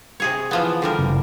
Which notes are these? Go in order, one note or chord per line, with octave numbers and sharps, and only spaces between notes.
C3 G#4 C#5
E3 F3 B3
D3 G3 A#4
F#1